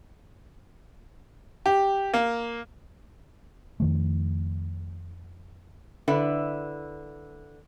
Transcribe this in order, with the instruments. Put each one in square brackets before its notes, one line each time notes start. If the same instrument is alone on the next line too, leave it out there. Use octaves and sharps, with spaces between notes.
[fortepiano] G4
A#3
[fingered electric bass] F2 D#3 A3
[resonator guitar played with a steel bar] D3 E4 B4 E5